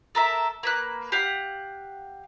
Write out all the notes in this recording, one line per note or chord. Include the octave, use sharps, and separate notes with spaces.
A4 A#4 E5
A#3 B4 F#6
G4 F5 F#5